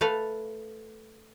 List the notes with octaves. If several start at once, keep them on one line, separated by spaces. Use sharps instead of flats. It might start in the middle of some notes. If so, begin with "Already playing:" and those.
A3 A4 B4 F5